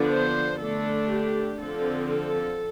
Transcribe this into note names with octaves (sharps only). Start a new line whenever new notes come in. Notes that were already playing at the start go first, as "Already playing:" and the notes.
Already playing: D3 F3 B3 D4
C5
D3 A3 D4 A4
G4
D3 F3 C4 A4
A4